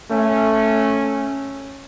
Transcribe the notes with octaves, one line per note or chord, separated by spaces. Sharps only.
A3 C#4